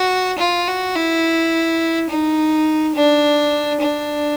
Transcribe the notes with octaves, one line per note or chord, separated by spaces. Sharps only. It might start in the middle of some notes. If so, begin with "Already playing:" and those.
Already playing: F#4
F4
F#4
E4
D#4
D4
D4